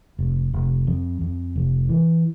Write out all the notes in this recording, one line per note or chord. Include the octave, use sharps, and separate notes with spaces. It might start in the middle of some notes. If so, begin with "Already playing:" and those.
F1
F1
F2
F2
F1
E3